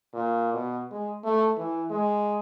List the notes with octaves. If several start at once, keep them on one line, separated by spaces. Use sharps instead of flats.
A#2
B2
G#3
A3
E3
G#3